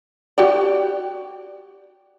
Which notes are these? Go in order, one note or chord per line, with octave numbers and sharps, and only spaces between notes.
F#4 G4 D5